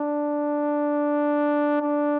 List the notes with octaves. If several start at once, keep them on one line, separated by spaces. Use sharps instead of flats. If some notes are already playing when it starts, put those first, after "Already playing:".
Already playing: D4
D4